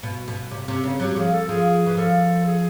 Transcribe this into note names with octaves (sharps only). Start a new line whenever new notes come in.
B2
B2
C3
C3
C#3
F#3 G4
F3 G#4
A4
F3 G#4
E3
F3 A4
G#4